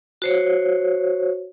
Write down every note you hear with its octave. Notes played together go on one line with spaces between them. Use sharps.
F#4 C5 C#5